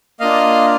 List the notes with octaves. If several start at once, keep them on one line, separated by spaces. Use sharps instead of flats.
A#3 D4 F4 D#5 F5